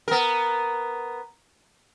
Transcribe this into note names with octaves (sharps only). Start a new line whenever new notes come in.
B3 A#4